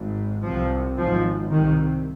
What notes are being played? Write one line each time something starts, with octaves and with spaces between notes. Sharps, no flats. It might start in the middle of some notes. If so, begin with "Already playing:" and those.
Already playing: G#1 G#2
C2 C3 F3
G#1 G#2 F3
C2 C3 D#3